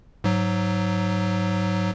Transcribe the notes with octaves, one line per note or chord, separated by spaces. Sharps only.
G#2 F#3